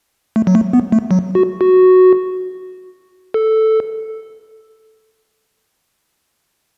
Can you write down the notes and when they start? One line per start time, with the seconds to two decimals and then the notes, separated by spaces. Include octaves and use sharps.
0.36 A3
0.47 F#3
0.55 A3
0.73 B3
0.92 A3
1.11 F#3
1.35 F#4
1.61 F#4
3.34 A4